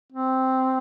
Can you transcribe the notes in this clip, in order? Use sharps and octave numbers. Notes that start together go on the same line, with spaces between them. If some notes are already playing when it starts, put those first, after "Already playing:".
C4